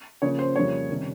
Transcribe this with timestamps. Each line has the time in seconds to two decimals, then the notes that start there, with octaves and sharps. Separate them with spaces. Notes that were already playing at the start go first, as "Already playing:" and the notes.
0.22 C#3 F3 A#3 C#4 C#5
0.39 C5
0.56 F2 C#3 G3 A#3 C#5
0.89 C3 D#3 G3 C#4